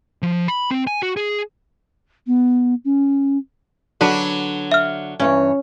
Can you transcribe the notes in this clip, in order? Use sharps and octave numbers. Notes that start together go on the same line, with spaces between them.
F3
B5
C4
G#5
F#4
G#4
B3
C#4
D3 F#3 D4 F#4 B4
E5 F6
G2 E3 C#4 C#5